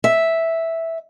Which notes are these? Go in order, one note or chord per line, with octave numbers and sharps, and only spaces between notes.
E5